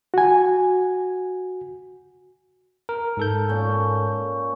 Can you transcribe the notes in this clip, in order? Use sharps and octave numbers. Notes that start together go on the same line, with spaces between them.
F#4 G#5
A#4
G#2 A4 G6
A#2 C#4 A5